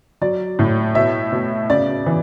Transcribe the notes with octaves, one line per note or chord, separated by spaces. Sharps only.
F#3 D5
A2
B2 E5
B2
C#3 D5
E3